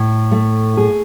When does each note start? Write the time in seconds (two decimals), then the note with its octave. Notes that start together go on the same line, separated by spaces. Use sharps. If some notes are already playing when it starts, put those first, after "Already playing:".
Already playing: A2
0.32 A3
0.77 G#4